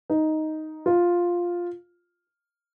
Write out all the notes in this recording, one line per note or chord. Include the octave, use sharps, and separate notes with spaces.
D#4
F4